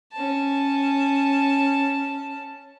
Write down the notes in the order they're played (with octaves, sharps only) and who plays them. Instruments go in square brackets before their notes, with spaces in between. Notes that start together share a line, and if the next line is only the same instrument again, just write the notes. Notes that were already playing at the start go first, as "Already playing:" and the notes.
[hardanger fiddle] C#4 A5